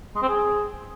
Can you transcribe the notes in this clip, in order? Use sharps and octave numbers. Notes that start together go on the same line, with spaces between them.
G#3
C4
G#4